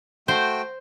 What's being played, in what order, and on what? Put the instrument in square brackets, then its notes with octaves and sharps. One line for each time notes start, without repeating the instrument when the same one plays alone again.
[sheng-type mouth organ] A3 F#4 G5 [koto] C5